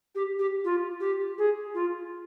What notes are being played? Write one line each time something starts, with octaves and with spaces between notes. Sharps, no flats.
G4
G4
F4
G4
G#4
F4